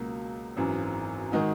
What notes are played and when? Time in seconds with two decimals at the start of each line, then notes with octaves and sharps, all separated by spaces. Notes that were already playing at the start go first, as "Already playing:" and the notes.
Already playing: C#2 B2 F#3 A#3
0.57 G#1 F#2 E3
1.32 D#3 G#3 D#4 F#4